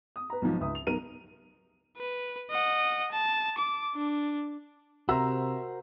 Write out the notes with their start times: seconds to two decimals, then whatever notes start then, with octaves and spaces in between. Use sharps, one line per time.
0.16 D#6
0.30 B4 A#5
0.42 B1 G#2 F3
0.60 C#2 E5 D#6
0.75 F7
0.87 B1 A#4 D#7
1.97 B4
2.50 D#5 F#5
3.11 A5
3.57 D6
3.95 D4
5.09 C3 F#4 A#4 C5 E5 A#5 E6